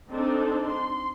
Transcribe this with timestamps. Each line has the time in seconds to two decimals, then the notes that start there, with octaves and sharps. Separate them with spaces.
0.10 C4 D4 D#4 A4
0.66 C6